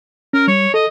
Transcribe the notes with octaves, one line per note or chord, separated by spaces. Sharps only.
C#4 A#4
G3 C#5
A4 D#5